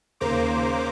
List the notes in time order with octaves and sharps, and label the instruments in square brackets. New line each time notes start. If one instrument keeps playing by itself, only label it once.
[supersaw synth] D#2 C#3 A#3 C5 A#5 D6